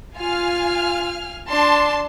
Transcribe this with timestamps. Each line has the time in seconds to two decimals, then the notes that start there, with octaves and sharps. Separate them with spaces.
0.18 F4 F5 G#5 F6
1.50 D4 A5 C6